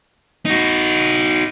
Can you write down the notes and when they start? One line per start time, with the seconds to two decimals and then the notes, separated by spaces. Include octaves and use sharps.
0.45 D#4 F#4